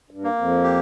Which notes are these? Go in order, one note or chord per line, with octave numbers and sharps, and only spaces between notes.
G2
A#3
F2
G4